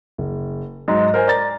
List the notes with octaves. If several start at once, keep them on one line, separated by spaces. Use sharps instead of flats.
F#1
G#2 F#3 G#3
A#4 C5 G#5
D5 A#5 A6